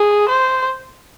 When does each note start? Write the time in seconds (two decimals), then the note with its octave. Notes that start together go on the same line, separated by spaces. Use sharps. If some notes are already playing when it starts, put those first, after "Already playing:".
Already playing: G#4
0.29 C5